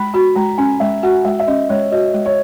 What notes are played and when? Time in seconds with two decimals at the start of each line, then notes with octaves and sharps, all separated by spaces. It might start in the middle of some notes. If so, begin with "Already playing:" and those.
Already playing: G#3 B5
0.14 F#4 B5
0.36 G#3 A#5
0.58 C#4 G#5
0.80 G#3 E5
1.03 F#4 F#5
1.25 G#3 E5
1.40 E5
1.47 C#4 D#5
1.69 G#3 C#5
1.92 F#4 D#5
2.14 G#3
2.26 C#5